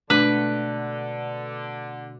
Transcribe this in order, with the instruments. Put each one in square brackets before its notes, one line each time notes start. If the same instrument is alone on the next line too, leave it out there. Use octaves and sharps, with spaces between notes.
[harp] B2 A3 [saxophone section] D3 [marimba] D4 [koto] B4